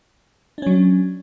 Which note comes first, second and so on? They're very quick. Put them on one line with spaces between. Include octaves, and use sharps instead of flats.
D4 C#4 F#3